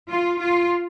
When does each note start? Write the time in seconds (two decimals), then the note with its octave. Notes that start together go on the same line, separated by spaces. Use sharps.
0.10 F4
0.41 F4